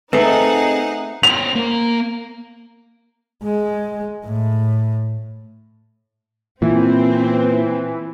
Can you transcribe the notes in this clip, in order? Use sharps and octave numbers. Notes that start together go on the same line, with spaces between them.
A3 C4 D#4 G#4 B4 F#5
C#4 C5 F7
A#3 A#4
G#3
A2
A#2 E3 C4